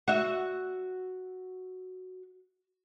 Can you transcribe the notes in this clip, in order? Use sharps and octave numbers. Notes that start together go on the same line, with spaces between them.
F#4 E5